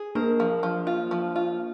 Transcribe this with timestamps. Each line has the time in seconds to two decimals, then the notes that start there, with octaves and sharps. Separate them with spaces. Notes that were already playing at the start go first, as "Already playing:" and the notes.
Already playing: G#4
0.15 A#3 D4 A#4
0.40 F3
0.63 F3
0.87 F4
1.11 F3
1.36 F4